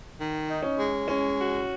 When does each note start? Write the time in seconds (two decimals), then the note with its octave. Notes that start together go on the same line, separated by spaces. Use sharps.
0.18 D#3
0.48 D#4
0.62 C#4
0.78 G#3
1.08 G#3 C#4
1.37 F#4